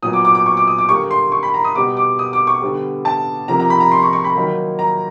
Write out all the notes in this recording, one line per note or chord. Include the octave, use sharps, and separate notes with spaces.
A#2 F#3 B3 D#6
D6
D6
D6
C#6
D6
D#6
D6
D3 G3 A#3 C#6
C6
C#6
B5
A#5
D#6
B2 G3 B3 D6
D6
D#6
D6
C#6
D3 G3 B3
A5
C3 F3 A#3 A#5
A#5
B5
A#5
C6
C#6
C#6
B5
D#3 F#3 A#3
A#5